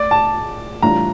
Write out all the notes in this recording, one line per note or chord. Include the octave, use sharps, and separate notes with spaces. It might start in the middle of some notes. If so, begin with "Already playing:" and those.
Already playing: A2 D5
A5
A2 E3 G3 D4 F4 A#5